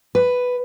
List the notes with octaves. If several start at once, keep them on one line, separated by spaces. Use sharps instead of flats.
B4